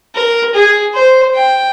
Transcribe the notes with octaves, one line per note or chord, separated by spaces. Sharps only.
A#4
G#4
C5
G5